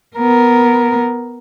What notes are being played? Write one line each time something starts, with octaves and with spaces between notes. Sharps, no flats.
B3 A#4